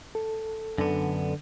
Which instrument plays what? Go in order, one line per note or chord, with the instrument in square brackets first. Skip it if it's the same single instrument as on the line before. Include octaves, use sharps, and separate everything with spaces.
[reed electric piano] A4
[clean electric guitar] F#2 B3 [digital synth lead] D3